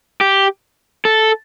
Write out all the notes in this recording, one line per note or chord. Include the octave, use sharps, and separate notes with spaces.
G4
A4